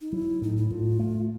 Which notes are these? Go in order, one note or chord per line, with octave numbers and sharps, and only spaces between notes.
D#4
F#3 E4
A2 D#4
E4
A2 F4
A3